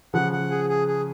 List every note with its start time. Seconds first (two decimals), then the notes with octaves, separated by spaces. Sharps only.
0.14 C#3 F3 F#5
0.32 F#5
0.51 G#4
0.69 G#4
0.87 G#4